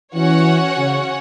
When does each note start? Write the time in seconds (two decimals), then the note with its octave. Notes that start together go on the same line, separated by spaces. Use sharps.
0.15 E3 C#4 F#4 C#5 F#5
0.77 C#3